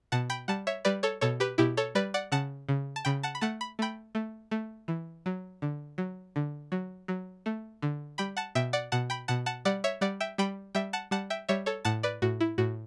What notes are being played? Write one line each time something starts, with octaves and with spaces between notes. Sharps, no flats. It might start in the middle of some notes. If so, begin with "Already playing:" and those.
B2 F#5 A5
G5 B5
G3 F#5 A5
C#5 E5
G3 B4 D5
A4 C#5
B2 A4 C#5
G4 B4
B2 E4 G4
A4 C#5
G3 B4 D5
D5 F#5
C#3 F#5 A5
C#3
A5
C#3 G5 B5
F#5 A5
B5
A3 F#5 A5
B5
A3 G5 B5
A3
A3
E3
F#3
D3
F#3
D3
F#3
F#3
A3
D3
G3 G5 B5
F#5 A5
B2 E5 G5
D5 F#5
B2 F#5 A5
G5 B5
B2 F#5 A5
F#5 A5
G3 D5 F#5
C#5 E5
G3 D5 F#5
E5 G5
G3 G5 B5
G3 E5 G5
F#5 A5
G3 F#5 A5
E5 G5
G3 C#5 E5
A4 C#5
A2 F#5 A5
B4 D5
A2 F#4
E4
A2 F#4